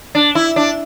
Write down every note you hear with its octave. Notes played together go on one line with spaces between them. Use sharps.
D4
E4
D4